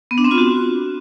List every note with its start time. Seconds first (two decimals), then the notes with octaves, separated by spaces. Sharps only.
0.11 B3
0.18 D4
0.24 C4
0.31 F4
0.38 F#4